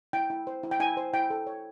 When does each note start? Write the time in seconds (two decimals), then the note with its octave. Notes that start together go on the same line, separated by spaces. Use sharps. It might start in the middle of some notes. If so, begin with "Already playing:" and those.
0.13 E4 G5
0.30 E4
0.47 C5
0.63 E4
0.71 G5
0.80 E4 G#5
0.97 C5
1.13 E4 G5
1.30 A4
1.47 C#5